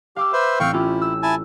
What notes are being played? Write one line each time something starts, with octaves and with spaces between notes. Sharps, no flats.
G4 F5 D6 E6
B4 C5 E5
A1 C4 F5 G5 C#6 E6
C#4 E4 F4 G4
E6
E4 G#5 A5